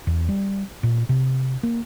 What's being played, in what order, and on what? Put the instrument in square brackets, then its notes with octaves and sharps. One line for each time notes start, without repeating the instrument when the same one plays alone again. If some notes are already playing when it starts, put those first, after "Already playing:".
[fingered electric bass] E2
G3
A#2
C3
A#3